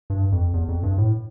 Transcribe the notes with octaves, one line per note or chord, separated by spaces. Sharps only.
G2
F2
E2
F2
G2
A2